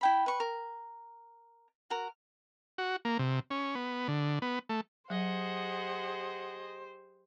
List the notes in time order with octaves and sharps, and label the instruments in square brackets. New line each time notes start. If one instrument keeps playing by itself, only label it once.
[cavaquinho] E4 G5 B5
B4 C#6
A#4
F#4 A#4
[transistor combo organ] F#4
A#3
C3
C#4
B3
D3
B3
A3
[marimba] F#3 [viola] G4 C5 [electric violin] G#4 D#5 [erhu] F#5